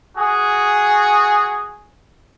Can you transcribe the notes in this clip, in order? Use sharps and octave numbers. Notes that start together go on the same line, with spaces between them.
F#4 G#4